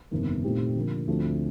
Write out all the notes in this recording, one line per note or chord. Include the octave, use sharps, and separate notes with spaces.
G1 F2 C3 D#3 A#3
A#2 A3 C4 D#4 G4
D3 F3 A#3
D2 D3 F3 A3 C4